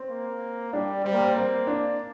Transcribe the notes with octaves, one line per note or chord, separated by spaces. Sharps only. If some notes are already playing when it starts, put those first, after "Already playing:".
Already playing: C4
A#3
G3 D4
G3 C4
A#3
C4
A#3 C4
D4